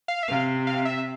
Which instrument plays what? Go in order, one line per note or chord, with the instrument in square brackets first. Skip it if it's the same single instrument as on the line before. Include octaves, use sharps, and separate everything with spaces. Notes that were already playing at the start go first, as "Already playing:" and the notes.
[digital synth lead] F5
E5
[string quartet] C3 [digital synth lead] F5
[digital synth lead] F5
E5